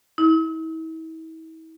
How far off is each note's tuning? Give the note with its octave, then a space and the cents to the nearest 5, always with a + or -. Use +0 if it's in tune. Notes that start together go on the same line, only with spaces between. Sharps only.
E4 -40